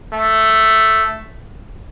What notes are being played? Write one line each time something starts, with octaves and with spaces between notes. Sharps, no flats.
A3